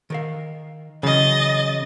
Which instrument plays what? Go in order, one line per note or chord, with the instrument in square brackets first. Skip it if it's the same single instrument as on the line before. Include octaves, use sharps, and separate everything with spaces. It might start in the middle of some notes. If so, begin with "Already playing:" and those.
[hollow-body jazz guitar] D#3 A#4 F5
[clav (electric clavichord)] C#3 [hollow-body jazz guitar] E3 F#3 [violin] D#5 A6